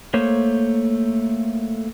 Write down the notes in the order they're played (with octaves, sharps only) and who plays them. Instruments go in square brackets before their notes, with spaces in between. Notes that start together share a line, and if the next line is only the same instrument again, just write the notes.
[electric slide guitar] A3 A#3 C5 C#5